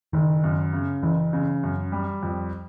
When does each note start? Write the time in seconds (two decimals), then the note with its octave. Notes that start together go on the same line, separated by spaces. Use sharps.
0.13 F#1 D#3
0.44 F#2
0.73 C#3
1.03 F#1 E3
1.33 C#3
1.63 F#2
1.92 G3
2.23 F2